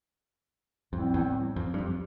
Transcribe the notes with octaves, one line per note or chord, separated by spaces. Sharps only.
F2 A2 G3 C4
E2
F2
G2
F2